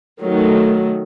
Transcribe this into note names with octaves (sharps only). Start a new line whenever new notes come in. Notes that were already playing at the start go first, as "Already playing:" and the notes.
D#3 F#3 A3